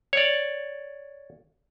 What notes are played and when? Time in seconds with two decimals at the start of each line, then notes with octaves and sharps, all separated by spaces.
0.13 C#5 D5